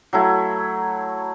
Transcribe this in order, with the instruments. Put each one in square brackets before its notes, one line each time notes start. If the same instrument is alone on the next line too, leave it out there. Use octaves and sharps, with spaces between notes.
[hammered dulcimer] F#3 A3 E4